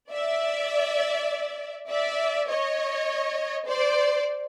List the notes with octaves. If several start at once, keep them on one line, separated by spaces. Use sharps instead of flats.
D5 E5
D5 E5
C#5 D#5
C5 D5